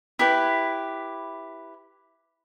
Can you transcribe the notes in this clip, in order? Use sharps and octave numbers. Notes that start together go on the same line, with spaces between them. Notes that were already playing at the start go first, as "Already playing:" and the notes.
E4 G4 B4